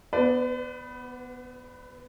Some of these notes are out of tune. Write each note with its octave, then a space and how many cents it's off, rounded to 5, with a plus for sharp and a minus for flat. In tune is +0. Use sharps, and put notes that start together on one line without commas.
B3 +0 B4 +40 D5 +0